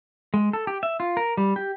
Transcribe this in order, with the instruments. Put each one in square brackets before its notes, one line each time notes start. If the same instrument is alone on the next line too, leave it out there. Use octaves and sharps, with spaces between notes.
[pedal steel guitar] G#3
A4
G4
E5
F4
A#4
G3
G4